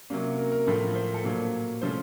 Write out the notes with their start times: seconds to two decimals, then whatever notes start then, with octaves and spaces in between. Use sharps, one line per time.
0.10 C3 F#3 A#3 C#4
0.38 A#4
0.52 A#4
0.67 A2 F3 A3 A4
0.81 A#4
0.95 C5
1.14 A4
1.23 A#2 F#3 A#3
1.81 F3 A3 C#4 C5